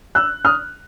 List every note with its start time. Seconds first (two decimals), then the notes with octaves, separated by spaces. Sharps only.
0.15 E6 F#6
0.45 D#6 F6